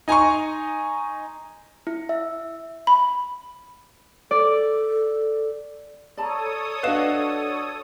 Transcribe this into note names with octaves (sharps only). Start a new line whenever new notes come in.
D#4 G#5 A#5 C6 C#6
E4
E5
B5
A4 D5
A4 C#5 D5 A5 A#5 D#6
D4 F#4 B4 D#5 F5 E7